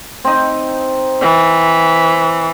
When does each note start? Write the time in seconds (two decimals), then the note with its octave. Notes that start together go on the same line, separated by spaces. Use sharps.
0.25 C4 D#4
1.21 E3